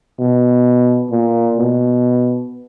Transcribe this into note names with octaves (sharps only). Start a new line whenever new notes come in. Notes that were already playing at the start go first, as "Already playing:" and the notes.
B2
A#2
B2